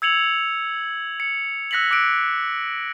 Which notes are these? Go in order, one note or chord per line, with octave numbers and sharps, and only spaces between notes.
E6 G#6 C#7 F7 F#7
C#7
E6 F#6 A#6 B6 C#7 F#7
D6 E6 F#6 D7